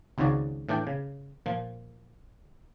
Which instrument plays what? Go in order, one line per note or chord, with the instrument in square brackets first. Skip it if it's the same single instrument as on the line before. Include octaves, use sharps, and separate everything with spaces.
[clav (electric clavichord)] G#1 C#2 G#2 C#3 F#4 D5
A2 E3 D4 D5 G5
C#3
A#2 F3